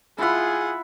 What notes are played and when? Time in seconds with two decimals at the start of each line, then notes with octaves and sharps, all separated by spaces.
0.18 E4 F4 G#4 E5 F#5